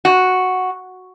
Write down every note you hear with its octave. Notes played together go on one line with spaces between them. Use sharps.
F#4